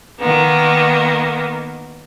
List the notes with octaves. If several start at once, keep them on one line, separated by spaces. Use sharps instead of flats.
D#3 A#3 B3